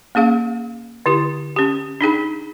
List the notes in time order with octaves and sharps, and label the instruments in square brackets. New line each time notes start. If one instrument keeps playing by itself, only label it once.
[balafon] A#3 C#4 G#4 F5
D3 E4 G4
C#4 G4
D4 D#4 G#4 B5